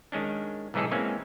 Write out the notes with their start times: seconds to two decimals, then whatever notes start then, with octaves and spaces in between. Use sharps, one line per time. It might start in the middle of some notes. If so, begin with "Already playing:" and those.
0.12 D#3 G#3 C#4 D4
0.74 B1 G#2 E3 D#4 G#4 A4
0.91 E3 G#3 A#3 C4 C#4